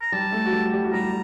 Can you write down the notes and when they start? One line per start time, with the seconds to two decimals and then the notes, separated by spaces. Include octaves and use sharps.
0.01 A#5
0.12 G3 G4 A5
0.32 A3 A4
0.45 F#4
0.52 G3 G4
0.72 G3 G4
0.84 F#4
0.93 G3 G4 A#5